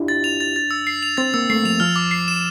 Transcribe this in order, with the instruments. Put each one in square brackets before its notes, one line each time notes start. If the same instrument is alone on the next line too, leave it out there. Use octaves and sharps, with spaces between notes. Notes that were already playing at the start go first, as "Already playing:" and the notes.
Already playing: [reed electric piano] D4 E4 F4 G4
[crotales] A6
F7
A6
A6
E6
C7
F7
[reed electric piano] C4 [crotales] A6
[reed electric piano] A#3 [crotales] E6
[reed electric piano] A3 [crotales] C7
[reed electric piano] F3 [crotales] F7
[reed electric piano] F3 [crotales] F6
[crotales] D6
C7
E7